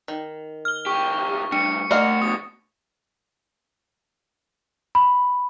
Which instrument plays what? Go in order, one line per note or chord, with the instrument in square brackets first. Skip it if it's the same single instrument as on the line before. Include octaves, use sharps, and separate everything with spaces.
[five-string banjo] D#3
[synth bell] F6 G7
[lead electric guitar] C#2 G4 [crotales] C#6
[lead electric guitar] A2 G3 [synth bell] D4 [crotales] C#7
[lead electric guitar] G3 F#5 [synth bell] A3 [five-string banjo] A#3 D#5 F5
[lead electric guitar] F2 B2 [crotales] D#6
[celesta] B5